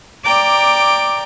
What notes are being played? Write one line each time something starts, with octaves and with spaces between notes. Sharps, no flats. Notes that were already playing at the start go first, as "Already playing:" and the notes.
D5 G5 A#5 D6